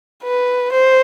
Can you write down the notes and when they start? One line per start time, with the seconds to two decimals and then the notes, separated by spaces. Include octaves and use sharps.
0.24 B4
0.72 C5